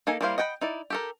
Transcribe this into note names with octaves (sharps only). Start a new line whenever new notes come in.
A#3 D#4 A4 G#5
G3 A#3 E4 C5 F5
D#5 F#5 G5 A5 B5
D#4 E4 D5
G4 A4 A#4